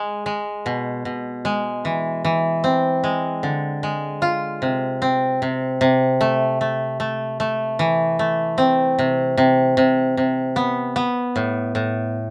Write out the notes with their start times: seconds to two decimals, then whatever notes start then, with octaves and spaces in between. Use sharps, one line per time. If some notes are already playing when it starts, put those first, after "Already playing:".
Already playing: G#3
0.26 G#3
0.66 B2
1.05 B2
1.45 G#3
1.85 E3
2.25 E3
2.64 C4
3.04 G#3
3.43 D3
3.83 G#3
4.22 F4
4.62 C3
5.02 C4
5.42 C3
5.81 C3
6.21 A3
6.61 A3
7.00 A3
7.40 A3
7.79 E3
8.19 A3
8.58 C4
8.99 C3
9.37 C3
9.77 C3
10.17 C3
10.56 B3
10.96 B3
11.36 A2
11.75 A2